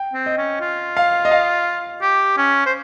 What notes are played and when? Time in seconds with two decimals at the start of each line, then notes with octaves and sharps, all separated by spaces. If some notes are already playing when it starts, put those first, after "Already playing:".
Already playing: G5
0.14 C4
0.26 D#5
0.37 C#4
0.61 F4
0.97 F5
1.25 D#5
1.31 F5
2.02 G4
2.37 C#4
2.66 C5